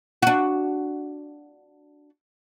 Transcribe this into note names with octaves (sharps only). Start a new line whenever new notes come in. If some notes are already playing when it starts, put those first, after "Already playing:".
D4 F#4